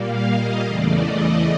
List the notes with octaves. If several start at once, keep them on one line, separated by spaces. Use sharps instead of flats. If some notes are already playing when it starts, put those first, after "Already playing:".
Already playing: A#2 G3 A#3 F5
D#5
E2 C#3 E3 A3 D5
D#5